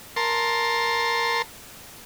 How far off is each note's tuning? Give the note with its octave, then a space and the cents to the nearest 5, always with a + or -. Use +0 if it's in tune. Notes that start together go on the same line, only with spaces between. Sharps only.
A#4 +0 A5 +0 C6 +10